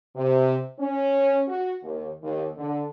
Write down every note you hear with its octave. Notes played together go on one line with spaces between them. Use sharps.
C3
C#4
F#4
D#2
D#2
D3